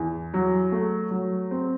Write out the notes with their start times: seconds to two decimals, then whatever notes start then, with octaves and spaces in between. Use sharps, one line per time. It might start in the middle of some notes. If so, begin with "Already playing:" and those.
Already playing: E2
0.34 F#3
0.72 A3
1.11 F#3
1.51 C4